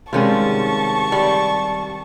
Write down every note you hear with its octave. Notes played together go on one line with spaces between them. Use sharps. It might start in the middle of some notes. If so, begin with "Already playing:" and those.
C3 D#3 G3 G#3 C#4 F4 A5 C#6
G3